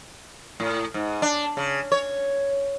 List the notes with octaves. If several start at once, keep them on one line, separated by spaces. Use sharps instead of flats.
A2
G#2
D4
C#3
C#5